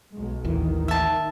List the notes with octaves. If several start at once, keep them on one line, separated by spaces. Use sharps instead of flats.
B1 G#3
A1 D#2 D#3 E3
E5 A5